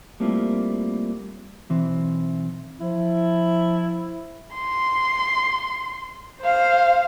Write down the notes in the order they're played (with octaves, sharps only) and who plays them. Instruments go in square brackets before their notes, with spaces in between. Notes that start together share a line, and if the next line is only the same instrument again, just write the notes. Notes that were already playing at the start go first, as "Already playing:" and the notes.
[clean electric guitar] G3 A3 A#3 C4 E4 F4
B1 E3 C4
[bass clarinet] F3 [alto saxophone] E4
[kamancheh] C6
C5 F5